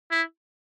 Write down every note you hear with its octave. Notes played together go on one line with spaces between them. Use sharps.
E4